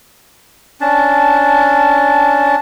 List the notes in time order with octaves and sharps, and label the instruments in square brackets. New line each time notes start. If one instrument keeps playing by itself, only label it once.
[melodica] C#4 D4 A5